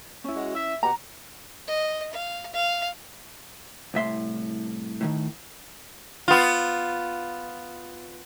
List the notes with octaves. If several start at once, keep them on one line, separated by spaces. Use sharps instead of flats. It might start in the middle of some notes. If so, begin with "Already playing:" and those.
C#4 E4
G#3 F#4
E5
B2 G4 F#5 A#5
D#5
F5
F5
C2 A2 E5 C6
A2 C3 D#3
B3 F4